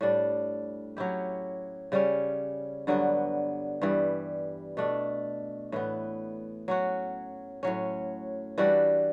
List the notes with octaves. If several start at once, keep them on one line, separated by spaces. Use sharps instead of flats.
A2 G3 D4
F#3 C#4 E4 G4
C#3 G3 C#4
G2 D3 F#3 B3
G2 E3 G3
B2 A3 D4
A2 E3 B3
F#3 C#4 F#4
A2 F#3 C#4
E3 G3 D4 F#4